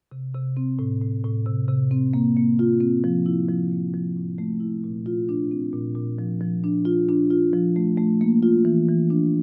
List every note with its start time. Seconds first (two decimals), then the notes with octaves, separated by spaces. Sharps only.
0.12 C3
0.34 C3
0.57 C4
0.79 A2
1.01 A2
1.24 A2
1.46 C3
1.68 C3
1.91 C4
2.14 A#3
2.37 A#3
2.59 F4
2.81 C4
3.04 F3
3.26 E4
3.48 F3
3.71 A#3
3.94 F3
4.17 A2
4.38 A3
4.60 E4
4.84 A#2
5.06 F4
5.29 D4
5.51 C4
5.74 A#2
5.95 A#2
6.18 F3
6.41 F3
6.64 D4
6.85 F4
7.09 D4
7.31 F4
7.53 F3
7.76 A3
7.97 A3
8.21 A#3
8.43 F4
8.65 E3
8.88 E3
9.10 D4